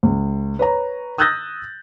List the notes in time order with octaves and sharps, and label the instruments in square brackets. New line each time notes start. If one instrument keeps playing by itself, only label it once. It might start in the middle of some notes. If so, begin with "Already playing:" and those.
[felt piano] C#2
B4 C#5 A#5
D#6 E6 F#6 G6 A6 A#6